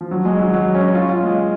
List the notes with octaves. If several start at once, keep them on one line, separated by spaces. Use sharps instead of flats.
F3
F#3
G#3
F#3
F#3
C#4
F4
F4
G#3